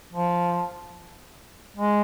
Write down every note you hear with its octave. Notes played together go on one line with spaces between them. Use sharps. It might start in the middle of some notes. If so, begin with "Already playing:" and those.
F3
G#3